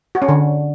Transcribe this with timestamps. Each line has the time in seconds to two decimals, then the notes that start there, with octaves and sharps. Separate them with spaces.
0.15 F#4
0.22 C#4
0.28 D3